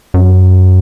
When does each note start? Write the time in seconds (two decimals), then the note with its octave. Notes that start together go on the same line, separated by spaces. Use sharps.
0.14 F#2